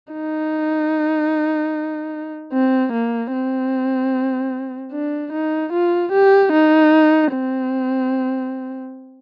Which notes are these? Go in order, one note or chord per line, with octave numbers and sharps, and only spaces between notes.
D#4
C4
A#3
C4
D4
D#4
F4
G4
D#4
C4